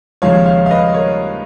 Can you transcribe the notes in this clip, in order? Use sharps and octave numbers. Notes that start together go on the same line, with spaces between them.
D#2 C#3 F3 G#3 C#5 F5
C#5 F5
F5
B4 D#5
A#4 C#5